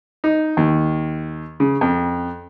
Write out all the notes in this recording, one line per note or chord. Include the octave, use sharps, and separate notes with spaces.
D#4
D#2
C#3
F2